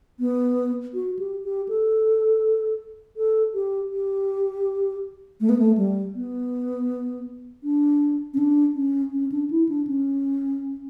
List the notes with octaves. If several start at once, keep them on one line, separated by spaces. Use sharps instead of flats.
B3
F#4
G4
G4
A4
A4
G4
G4
A3
B3
A3
G3
B3
D4
C#4
D4
C#4
C#4
D4
E4
D4
C#4